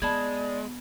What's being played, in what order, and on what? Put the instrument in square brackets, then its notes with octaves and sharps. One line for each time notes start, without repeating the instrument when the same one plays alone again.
[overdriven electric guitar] G#3 [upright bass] B3 [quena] D5 [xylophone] A5 B5 G#6